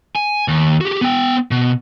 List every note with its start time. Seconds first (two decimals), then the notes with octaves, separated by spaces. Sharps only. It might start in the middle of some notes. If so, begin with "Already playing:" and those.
0.16 G#5
0.48 D#2
0.81 F#4 G4
1.01 B3 G5
1.51 B2